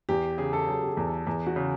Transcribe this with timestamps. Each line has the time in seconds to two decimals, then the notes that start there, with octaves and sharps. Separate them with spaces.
0.09 E2 G4
0.38 C#3 G#4
0.53 A4
0.68 F#3 G#4
0.83 G4
0.87 G#4
0.97 E2
1.07 A4
1.27 E2 G#4
1.47 F#4
1.56 C#3